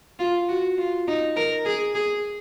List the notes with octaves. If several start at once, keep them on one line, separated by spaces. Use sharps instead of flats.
F4
F#4
F4
D#4
A#4
G#4
G#4